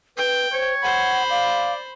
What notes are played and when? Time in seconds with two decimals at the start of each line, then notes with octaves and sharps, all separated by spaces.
0.18 B4 G5
0.53 C5 C#5
0.83 C5 F#5 B5
1.30 D5 F5